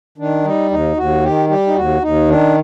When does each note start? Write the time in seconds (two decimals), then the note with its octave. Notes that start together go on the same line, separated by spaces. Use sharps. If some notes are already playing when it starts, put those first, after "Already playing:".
0.18 D#3 D4
0.44 G3 D#4
0.71 D#2 D#4
0.97 D#2 F#4
1.23 D#3 G4
1.49 G3 G4
1.67 D#4
1.75 D#2 F#4
2.02 D#2 D#4
2.28 D#3 D4